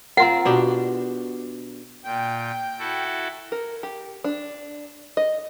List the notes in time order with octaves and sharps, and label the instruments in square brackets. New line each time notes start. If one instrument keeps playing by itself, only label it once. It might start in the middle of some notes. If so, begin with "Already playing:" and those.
[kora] C4 F4 A#4 [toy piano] F#5
[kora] B2 D4 G4
[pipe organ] A#2 [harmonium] G5
[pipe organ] E4 F#4 A4
[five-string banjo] A#4
G4
D4
D#5